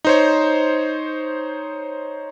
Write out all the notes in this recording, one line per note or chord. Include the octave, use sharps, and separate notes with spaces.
D#4 C5 C#5